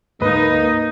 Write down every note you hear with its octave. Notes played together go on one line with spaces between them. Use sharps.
D2 G#2 A#3 D#4 B4 D#5